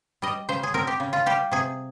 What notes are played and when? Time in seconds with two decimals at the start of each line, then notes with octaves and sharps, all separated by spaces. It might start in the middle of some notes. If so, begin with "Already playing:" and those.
0.22 G3 D#5
0.49 C#3 C5
0.63 G#4
0.74 C4 A#4
0.87 G4
1.00 C#3
1.13 F4
1.26 G3 G4
1.52 C3 G#4